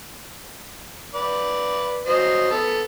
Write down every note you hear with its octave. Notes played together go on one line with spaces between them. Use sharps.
B4 D5
F#3 C5 D#5
B3 A4